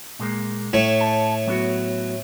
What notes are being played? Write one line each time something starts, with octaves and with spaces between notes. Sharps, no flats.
A#2 G#3 A#3
A2 A3 C#5
A5
F#3 B3 F#4